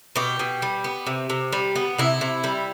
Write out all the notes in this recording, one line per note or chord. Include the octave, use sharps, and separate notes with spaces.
B2 G4
B2
G3
B3
C3
C3
G3
B3
C3 E4
C3
G3